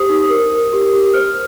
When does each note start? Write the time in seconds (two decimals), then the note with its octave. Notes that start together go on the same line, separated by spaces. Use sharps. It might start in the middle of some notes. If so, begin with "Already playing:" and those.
Already playing: G4 C5 D#6
0.09 D#4
0.30 A#4
0.51 A#4
0.73 G4
0.93 G4
1.14 C5 F6